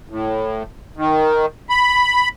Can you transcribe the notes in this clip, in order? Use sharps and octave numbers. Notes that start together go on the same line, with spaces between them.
A2
D#3
B5